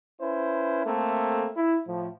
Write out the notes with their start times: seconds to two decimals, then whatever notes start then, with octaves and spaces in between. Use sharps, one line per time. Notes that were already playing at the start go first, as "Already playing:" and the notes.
0.22 C#4 E4 B4 C5
0.86 A3 A#3 C4 A4
1.57 E4
1.88 A2 F3